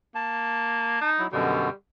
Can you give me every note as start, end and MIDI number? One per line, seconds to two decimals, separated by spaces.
0.15 1.00 58
0.15 1.10 81
1.01 1.24 63
1.19 1.27 54
1.19 1.27 64
1.32 1.69 42
1.32 1.69 47
1.32 1.69 50
1.32 1.72 55